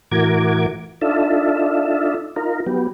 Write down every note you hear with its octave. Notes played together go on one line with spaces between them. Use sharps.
A2 E3 F#4 A#4 D6 G#6
D4 D#4 F4 A4 E5
D#4 F4 A#4
F#3 B3 G4